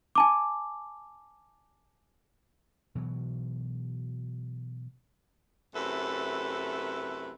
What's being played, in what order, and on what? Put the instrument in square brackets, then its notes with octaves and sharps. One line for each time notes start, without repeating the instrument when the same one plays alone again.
[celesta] G#5 A5 D6
[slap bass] B2 E3 F#3
[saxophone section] F#2 C3 A3 E4 A4 B4